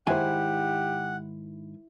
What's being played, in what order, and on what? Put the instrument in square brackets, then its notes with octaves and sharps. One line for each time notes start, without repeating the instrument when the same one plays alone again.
[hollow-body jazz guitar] G#2 D#3 G#5 [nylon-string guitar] E4 C5 [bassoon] G4 [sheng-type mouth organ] F#5